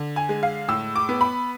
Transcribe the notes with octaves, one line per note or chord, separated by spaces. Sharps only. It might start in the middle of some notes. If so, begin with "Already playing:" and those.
Already playing: D3
G#5
G#3
F5
A2 E6
D6
B3
B5